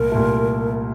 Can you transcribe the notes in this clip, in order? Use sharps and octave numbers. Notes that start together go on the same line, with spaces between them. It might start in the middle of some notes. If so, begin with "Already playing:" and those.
Already playing: C2 A#2 A3 A#4
C2 A#2 A3